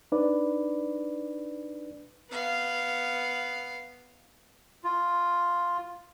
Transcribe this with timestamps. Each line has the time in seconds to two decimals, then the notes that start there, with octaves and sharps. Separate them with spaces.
0.12 D4 D#4 B4 D5
2.30 B3 F5
4.84 F4